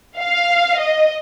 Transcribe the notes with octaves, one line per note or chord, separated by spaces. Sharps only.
F5
D#5